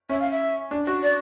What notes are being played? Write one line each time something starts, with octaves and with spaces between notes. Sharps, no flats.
C#4 E5
F5
E5
D4
F#4
D5